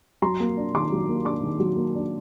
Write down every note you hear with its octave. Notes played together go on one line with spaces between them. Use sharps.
F#3 A#5 C6
A#3
D4
D#3 C6 D6
F#3
A#3
D4 C6 D6
D#3
F#3
A#3
D4